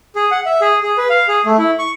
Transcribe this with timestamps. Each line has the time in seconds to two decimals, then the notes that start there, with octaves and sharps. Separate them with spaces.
0.16 G#4
0.31 F#5
0.46 E5
0.61 G#4
0.83 G#4
0.98 B4
1.10 F5
1.28 G#4
1.45 A3
1.58 E4
1.79 C#6